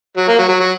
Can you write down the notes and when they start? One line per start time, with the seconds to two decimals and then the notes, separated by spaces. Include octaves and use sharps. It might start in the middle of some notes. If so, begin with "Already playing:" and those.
0.17 F#3
0.28 A#3
0.38 F#3
0.48 F#3
0.60 F#3